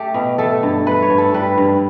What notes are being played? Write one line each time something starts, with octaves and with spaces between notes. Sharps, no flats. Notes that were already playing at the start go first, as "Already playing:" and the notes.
Already playing: A3 G4
B2
A3 A4
G2
A3 B4
C#5
G2
A4
G3 B4
G2